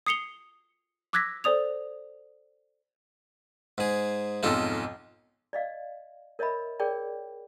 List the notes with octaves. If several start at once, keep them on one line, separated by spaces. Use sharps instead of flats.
D#6 C7 C#7 F7 G7
D6 E6 F#6 G#6 A#6 B6
A4 C5 D5 D#6 F7
G#2 G#4
B1 F2 G#2 D#4 F4 A4
D5 D#5 F5
A#4 C#5 D#5 E5 B5
G#4 A#4 C#5 D5 G5